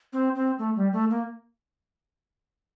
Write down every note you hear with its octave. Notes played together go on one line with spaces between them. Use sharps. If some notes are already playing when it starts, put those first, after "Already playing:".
C4
C4
A3
G3
A3
A#3